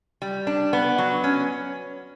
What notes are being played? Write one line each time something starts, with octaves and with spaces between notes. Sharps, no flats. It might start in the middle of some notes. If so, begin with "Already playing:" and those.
G3
D4
B3
F#3
C#4